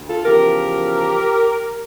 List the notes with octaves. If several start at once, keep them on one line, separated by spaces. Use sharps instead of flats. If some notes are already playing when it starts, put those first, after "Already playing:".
Already playing: D2
F4 A4
E2 C#3 F3 G4 A#4